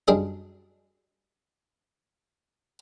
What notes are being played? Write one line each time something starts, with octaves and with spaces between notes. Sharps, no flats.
F#2 G3 D4 G#4 D#5